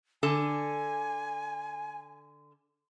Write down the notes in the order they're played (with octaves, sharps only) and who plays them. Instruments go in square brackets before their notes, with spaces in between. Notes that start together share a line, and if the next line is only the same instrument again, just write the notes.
[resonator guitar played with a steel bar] D3 A4 A5 [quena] G#5